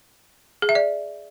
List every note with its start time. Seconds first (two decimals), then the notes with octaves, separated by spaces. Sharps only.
0.62 G#4
0.69 E5
0.75 D5